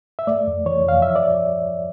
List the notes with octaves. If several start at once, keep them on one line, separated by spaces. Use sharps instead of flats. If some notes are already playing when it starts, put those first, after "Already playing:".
E5
A3 D5
F2
E3 C#5
F2 F5
F3 E5
D5